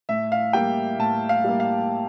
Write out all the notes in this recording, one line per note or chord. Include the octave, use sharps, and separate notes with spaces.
A2 E5
F5
G3 A#3 G5
A2 A5
F5
G3 A#3
F5